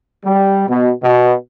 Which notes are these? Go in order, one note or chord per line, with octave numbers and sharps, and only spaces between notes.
G3
B2
B2